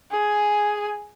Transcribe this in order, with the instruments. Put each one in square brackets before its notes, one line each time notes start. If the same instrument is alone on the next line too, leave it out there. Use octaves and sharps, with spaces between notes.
[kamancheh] G#4 G#5